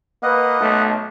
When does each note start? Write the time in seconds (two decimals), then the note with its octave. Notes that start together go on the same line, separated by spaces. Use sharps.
0.23 A#3 B4 D#5 F#5
0.61 B1 A3